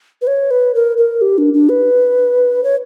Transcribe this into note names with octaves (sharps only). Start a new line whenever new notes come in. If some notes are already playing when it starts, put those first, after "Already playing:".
B4
C#5
B4
A#4
A#4
G4
D4
D4
B4
C#5